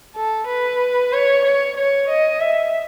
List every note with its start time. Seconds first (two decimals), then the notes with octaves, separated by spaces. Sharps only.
0.16 A4
0.47 B4
1.13 C#5
1.45 C#5
1.77 C#5
2.09 D#5
2.40 E5